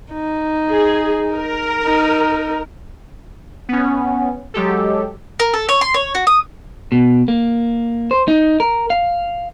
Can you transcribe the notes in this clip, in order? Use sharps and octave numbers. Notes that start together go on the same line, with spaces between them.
D#4
G#4
A#4
D#4
B3 C#4
F#3 G#3 G4 A4
A#4
A4
C#5
C6
C#5
F#4
D#6
B2
A#3
C5
D#4
A#4
F5